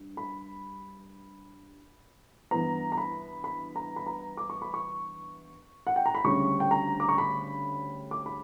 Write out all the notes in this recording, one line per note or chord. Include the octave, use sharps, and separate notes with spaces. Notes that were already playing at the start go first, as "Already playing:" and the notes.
Already playing: G2
B5
G2 E3 B3 A#5
A#5
B5
B5
A#5
B5
A#5
D6
C#6
B5
C#6
F#5
G5
A#5
B5
D2 C#3 G3 C#6
G5
A#5
D6
C#6
B5
D6
B5